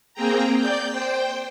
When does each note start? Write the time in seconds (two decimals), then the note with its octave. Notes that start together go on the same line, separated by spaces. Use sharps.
0.14 A#3 C4 G#4 G5 A#5
0.58 D5 G6
0.89 C5 G5